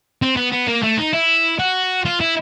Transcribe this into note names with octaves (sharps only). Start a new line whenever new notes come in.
C4
B3
B3
A#3
A3
D#4
E4
F#4
F4
E4